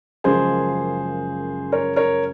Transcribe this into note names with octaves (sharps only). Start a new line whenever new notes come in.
F#1 F#2 C#3 F3 G#3 G#4 C5
A#4 C#5
A#4 C#5